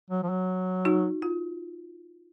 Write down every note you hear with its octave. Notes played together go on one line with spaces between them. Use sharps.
F#3
F3
F#3
D#4 F#4
F4